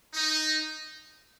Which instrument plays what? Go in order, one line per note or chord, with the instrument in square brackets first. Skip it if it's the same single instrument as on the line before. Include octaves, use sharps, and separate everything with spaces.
[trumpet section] D#4